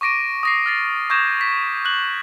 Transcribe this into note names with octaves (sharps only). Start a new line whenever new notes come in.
C#6 D6 A#6 D7 D#7
D#6 A#6 C7
F6 A6 C7
C#6 D#6 G6 G#6 A#6 E7
B6
F#6 F#7